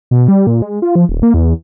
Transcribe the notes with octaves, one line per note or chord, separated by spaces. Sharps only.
B2
G3
A#2
G#3
F4
F3
D#1
A#3
E2